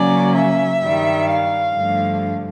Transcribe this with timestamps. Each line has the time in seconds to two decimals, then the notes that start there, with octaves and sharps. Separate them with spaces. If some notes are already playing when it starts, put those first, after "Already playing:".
Already playing: C#3 F#3 A#3 C#4 D5
0.35 E5
0.82 G2 D#3 G3
1.30 F5
1.76 G2 D3 F3 A3